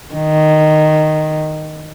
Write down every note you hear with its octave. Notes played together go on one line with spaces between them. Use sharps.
D#3